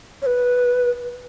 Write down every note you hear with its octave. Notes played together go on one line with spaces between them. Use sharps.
C#5
B4